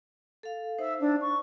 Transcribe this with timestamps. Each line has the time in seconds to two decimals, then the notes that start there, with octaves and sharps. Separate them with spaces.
0.43 A4 F5
0.79 D#4 C5 E5
1.00 D4
1.21 C#6